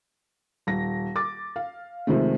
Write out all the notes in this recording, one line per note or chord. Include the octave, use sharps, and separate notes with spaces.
D#1 A#6
D6 A6
F5
C3 D#3 F3 G#3 A3